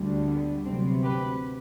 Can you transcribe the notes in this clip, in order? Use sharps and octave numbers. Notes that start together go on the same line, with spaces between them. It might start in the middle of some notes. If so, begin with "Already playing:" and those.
Already playing: D2 D3 G3
B3
D2 C3 F#3 B3 C4
G4 B4